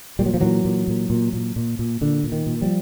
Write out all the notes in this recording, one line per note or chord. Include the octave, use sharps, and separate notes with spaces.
A#2 G3
F#3
F3
A#2 E3 F#3
A#2
A#2
A#2
A#2
A#2
A#2
A#2 D3
A#2
D#3
A#2
F3 G3